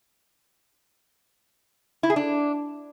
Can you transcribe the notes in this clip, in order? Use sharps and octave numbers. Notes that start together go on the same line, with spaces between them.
E4
G#4
D4